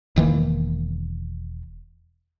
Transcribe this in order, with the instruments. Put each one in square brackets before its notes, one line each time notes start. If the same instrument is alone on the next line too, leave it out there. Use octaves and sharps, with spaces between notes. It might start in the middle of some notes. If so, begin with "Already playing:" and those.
[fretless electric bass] E1 D#3 E3 A#3